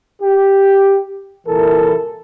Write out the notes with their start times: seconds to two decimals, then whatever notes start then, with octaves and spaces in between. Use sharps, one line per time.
0.22 G4
1.47 C2 A#2 E3 E4 A4 A#4